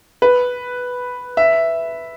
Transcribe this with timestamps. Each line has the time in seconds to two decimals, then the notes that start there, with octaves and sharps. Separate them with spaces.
0.22 B4
1.37 E5